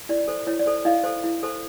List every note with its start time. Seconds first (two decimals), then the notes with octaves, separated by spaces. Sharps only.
0.09 E4 D5
0.28 A4 C5
0.47 E4 C#5
0.60 D5
0.66 A4 C5
0.85 E4 D#5 F5
1.04 A4 C5
1.24 E4
1.43 A4 C5